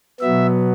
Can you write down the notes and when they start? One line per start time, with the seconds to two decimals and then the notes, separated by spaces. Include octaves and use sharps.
0.21 B2 F#3 B3 E5